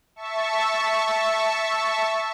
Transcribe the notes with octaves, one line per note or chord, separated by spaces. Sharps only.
E5 A5 C#6